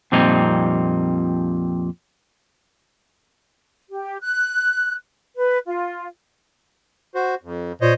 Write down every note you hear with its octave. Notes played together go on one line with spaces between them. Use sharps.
F2 A#2 G3 C4 D#4
G4
F#6
B4
F4
F#4 C5
F2
A#2 C5 C#5 D#5